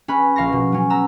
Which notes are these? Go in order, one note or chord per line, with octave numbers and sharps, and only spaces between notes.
C#4 B4 B5
A#1 F5 C#6 A#6
B2
F#3 C#4
B3 A#5 E6